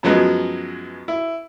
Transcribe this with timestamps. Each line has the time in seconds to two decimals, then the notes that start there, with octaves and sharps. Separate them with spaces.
0.03 F#2 F3 F#3 G#3 B3
1.08 E4